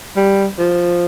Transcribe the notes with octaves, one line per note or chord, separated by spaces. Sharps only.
G3
F3